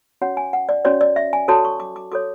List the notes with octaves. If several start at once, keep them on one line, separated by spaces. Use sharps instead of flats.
C#4 F#4 C#5 F#5
G#5
F#5
D5
C#4 F#4 C#5 D5
D5
E5
G#5
F#4 A4 C#5 A5
C#6
D6
D6
F#4 A4 C#5 D6